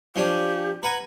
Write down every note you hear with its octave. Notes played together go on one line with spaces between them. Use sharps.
F3 C#4 D4 G4
B4 F#5 G#5 A#5